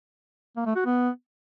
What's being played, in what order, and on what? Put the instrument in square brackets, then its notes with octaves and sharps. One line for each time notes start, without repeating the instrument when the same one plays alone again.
[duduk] A#3
A3
F#4
B3